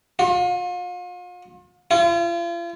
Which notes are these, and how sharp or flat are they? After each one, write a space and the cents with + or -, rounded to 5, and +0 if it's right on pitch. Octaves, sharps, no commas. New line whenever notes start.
F4 +40
F4 -40